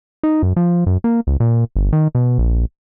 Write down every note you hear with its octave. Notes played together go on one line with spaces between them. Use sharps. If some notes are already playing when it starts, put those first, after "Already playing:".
D#4
F#2
F3
F#2
A#3
C#2
A#2
G1
D#3
B2
A#1